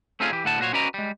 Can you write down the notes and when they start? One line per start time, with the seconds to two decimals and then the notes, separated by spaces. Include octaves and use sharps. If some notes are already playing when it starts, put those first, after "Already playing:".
0.20 A3 C4 C#4 D#4 F4 G#4
0.32 E3 G4
0.44 D2 A2 F#5 A5
0.59 A#2 F#4 C5 C#5
0.73 C#4 F#4 B4 D5 D#5 A#5
0.94 G3 G#3